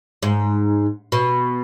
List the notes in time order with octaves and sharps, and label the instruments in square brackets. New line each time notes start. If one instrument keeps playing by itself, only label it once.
[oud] G#2
B2